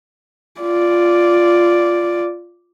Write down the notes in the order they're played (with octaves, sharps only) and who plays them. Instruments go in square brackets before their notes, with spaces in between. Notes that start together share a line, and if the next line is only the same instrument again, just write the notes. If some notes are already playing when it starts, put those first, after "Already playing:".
[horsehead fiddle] F4 D5